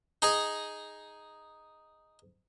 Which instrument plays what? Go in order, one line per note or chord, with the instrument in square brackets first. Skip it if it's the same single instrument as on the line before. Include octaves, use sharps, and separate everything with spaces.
[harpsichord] D#4 G#4 D#5